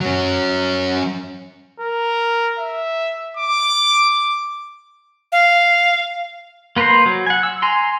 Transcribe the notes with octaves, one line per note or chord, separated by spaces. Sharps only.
F#3 C#4
A#4
E5
D6
F5
A#3 B4 C5 A#5 C6
F#3
F#5 G#5
E6
G#5 A#5 C6